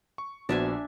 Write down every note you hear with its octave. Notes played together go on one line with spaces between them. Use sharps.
C#6
A#1 B3 D4 F#4 C5 E5 G#5